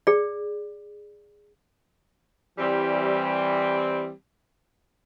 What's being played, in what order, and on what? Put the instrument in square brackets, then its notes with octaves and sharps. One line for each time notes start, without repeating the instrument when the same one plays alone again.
[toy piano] G#4 D5
[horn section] E3 G3 C4